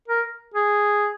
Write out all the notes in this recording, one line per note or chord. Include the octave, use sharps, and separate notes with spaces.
A#4
G#4